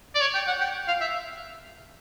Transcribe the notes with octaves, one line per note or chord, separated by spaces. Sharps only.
D5
C#5
G5
F#5
G5
F5
E5